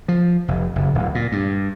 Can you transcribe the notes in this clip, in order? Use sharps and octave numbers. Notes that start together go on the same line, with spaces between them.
F3
F1
F#1
D1
A#2
G2